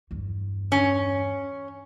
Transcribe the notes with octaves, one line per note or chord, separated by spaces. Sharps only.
E2 G2
C#4